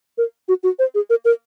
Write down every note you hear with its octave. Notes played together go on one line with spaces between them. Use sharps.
A#4
F#4
F#4
C5
G#4
A#4
A#4